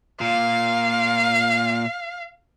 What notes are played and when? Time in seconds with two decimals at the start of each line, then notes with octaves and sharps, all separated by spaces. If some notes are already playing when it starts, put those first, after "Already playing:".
0.21 A#2 F5